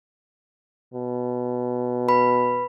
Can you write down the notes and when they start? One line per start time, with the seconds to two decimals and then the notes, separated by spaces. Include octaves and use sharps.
0.94 B2
2.08 B4 B5